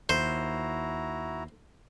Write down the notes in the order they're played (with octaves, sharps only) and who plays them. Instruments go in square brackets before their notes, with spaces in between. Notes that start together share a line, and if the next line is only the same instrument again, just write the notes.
[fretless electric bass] D#2 [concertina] E4 F#4 A#5 [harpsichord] C5